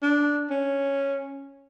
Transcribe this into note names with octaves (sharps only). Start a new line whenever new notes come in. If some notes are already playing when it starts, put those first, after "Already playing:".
D4
C#4